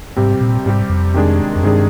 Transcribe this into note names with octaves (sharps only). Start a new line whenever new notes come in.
G#2 C3 G3 C4 G4
A#2
G#2 C3 G3 C4 G4
F2
C3 D#3 G#3 D4 G#4
F2
G2 C3 D#3 G#3 D4 G#4